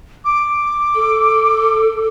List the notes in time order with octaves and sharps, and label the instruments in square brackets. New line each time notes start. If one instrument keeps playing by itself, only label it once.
[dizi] D6
[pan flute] A4